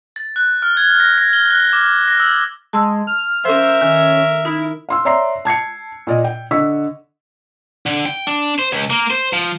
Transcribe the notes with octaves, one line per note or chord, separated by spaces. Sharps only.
A6
F#6
F6
G#6
A#6
A#6
G7
F#6
D6
A#6
E6
G#3 A5 C6 E6
F6
F3 C#4 A#4 C5 E5
D#3 C#4
D#4 E4
F5 C6 E6
C#5 D5 E5 A#5 C6 C7
A5 G#6 C7 C#7
A#2 D5 D#5
G5
D3 D#5 C#6 E6 B6
D3
G5
D4
C5
C#2
A#3
C5
F3